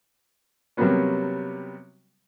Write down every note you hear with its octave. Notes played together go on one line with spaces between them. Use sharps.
C3 F#3 G3 A#3 B3 C#4